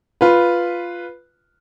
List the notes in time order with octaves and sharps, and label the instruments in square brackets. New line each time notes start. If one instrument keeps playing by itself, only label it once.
[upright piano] F4 B4